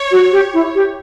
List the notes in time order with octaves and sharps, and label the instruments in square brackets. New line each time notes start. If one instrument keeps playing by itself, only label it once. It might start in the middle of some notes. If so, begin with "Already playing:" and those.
Already playing: [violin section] C#5
[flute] F#4
G4
E4
G4